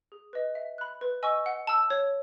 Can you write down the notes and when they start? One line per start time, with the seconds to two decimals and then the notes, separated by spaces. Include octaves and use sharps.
0.12 G#4
0.33 B4 D#5
0.55 E5
0.78 B5 F#6
1.01 B4
1.23 D#5 G#5 C#6 E6
1.46 F#5
1.67 A5 E6
1.90 C#5